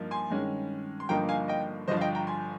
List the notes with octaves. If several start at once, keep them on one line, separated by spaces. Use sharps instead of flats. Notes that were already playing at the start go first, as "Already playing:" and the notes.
Already playing: G2 F3 A#3 D#4
G#5 C6
G2 D#3 G#3 C#4
C6
G1 G2 F3 A#3 D#4 G5 A#5
F5 G#5
D#5 G5
G1 G2 F3 C5 D#5
F5
D#5 G5
G5 A#5
G#5 C6